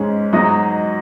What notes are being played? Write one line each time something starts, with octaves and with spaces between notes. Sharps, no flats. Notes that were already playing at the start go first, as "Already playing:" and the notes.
Already playing: G#2 G#3 C#4
G#2 F#3 D#4 F#4 D#5